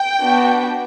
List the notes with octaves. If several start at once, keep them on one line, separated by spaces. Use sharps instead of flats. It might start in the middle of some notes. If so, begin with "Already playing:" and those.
Already playing: G5
B3 D4 F#4